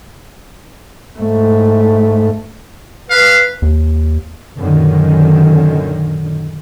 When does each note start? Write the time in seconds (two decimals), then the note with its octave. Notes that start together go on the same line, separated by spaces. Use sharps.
1.19 G#2 A3
3.11 B4 F5
3.62 D#2
4.59 F#2 A#2 D3 D#3